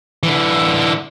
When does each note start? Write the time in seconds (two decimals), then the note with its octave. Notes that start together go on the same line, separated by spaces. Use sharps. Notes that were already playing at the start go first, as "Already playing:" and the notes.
0.23 D3 E3